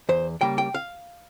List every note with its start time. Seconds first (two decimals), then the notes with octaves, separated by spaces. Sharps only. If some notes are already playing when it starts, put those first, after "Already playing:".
0.09 E2 C5
0.41 C#3 G3 A#3 G5
0.58 G5
0.74 F5